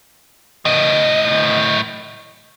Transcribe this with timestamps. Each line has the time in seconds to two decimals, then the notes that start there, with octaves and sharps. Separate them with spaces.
0.65 A2 D#5